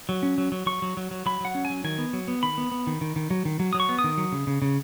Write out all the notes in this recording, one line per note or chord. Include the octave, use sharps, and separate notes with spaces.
F#3
C#4
F#3
F#3
F#3 C#6
F#3
F#3
F#3
F#3 B5
F#3 F#5
C#4
G#5
F#3
D#3 G#5
B3
F#3
B3
D#3 B5
B3
B3
D#3
D#3
D#3
F#3
D#3
F#3
F#3 D#6
C#6
B3
D#6
D#3
F#3
C#3
C#3
C#3